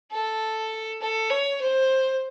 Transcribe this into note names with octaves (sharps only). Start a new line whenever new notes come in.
A4
A4
C#5
C5